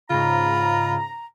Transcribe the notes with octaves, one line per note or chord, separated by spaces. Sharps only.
G#2 C#3 F4 A#5 B5